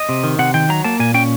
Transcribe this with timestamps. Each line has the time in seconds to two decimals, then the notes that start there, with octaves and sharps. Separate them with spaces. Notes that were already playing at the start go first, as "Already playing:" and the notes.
Already playing: D#5
0.09 C3
0.24 D#3
0.39 C3 F#5
0.54 D#3 G5
0.69 F#3 A#5
0.84 A#3 A5
1.00 A#2 G#5
1.14 C#4 G5